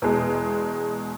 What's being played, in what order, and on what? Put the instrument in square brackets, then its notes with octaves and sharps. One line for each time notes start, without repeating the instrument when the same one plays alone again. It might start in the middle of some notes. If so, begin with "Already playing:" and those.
[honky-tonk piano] E2 B2 G#3